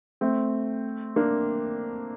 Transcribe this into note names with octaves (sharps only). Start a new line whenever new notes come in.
A3 C4
A#3 D4